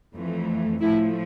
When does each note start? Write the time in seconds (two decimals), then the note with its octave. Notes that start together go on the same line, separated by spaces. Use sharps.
0.15 F2 E3 A3
0.81 A2 F3 A3 E4